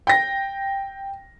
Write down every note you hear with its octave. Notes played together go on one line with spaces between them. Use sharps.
G5 A#6